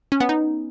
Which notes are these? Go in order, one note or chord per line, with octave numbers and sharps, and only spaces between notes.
C#4
B3
D#4